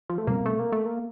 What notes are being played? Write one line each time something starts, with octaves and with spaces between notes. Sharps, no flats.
F3
A3
B2 G3 A#3 C4
A3
A#3
A3
A#3